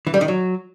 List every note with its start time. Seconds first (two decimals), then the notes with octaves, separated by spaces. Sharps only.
0.07 E3
0.14 G3
0.21 D#3
0.28 F#3